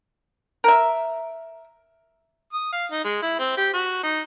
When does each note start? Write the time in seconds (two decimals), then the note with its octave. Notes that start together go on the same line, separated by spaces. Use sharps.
0.64 A#4 E5
2.53 D#6
2.72 F5
2.92 D#4
3.05 G#3
3.22 E4
3.39 C4
3.57 G4
3.74 F#4
4.03 D#4